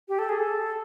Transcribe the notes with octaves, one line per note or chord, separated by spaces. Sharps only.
G4
A4
G#4
A4